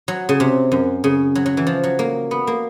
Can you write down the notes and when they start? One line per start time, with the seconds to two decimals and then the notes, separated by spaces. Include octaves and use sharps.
0.08 F#3
0.29 C#3
0.40 C3
0.72 F#2
1.04 C#3
1.35 F#3
1.46 F#3
1.57 E3
1.67 F3
1.84 F#3
1.99 A#3
2.31 B3
2.47 A#3